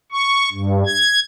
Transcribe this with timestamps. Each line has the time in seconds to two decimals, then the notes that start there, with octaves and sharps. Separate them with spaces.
0.12 C#6
0.52 G2
0.86 G#6